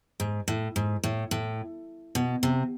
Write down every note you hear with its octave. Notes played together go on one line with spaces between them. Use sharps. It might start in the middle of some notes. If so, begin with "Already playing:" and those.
G#2
A2
G#2
A2
A2
B2
C3